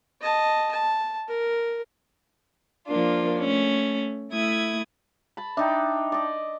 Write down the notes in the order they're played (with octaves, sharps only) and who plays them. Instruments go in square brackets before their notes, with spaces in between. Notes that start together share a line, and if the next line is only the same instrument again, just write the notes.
[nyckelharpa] D#5 A5
A5
A#4
[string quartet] F3 A#3 D4 F4
A3 C#4
A3 E4 D#6 G#6
[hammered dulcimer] A5 B5
[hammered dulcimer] D4 D#4 [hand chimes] E5 G5
[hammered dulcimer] D5 D#5